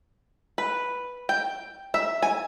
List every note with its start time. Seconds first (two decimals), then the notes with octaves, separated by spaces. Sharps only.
0.58 B4
1.29 G5
1.94 E5
2.22 G#5